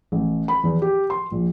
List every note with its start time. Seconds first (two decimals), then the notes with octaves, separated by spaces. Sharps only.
0.12 A1
0.48 B5
0.63 E2
0.82 G4
1.10 C6
1.32 A#1